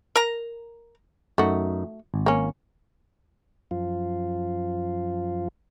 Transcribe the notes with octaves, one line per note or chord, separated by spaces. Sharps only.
A#4 A#5
F#2 A3 D#4 F#4
G#1
A#3 C#4
F#2 F3 F4